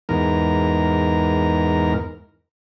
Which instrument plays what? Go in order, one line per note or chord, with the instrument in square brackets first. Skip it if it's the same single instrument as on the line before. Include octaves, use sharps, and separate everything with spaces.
[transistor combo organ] E2 G#2 A#4